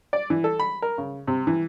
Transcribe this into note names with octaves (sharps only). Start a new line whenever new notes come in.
D5
E3
A4
B5
A#4
C#3
C3
E3